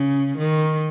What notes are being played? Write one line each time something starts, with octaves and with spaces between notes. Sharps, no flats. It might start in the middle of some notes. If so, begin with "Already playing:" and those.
Already playing: C#3
D#3